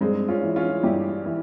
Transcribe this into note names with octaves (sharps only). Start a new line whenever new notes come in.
G2 G#3 C4
C#4 F4
E3
C#4 F4
G2 E4 G4
E3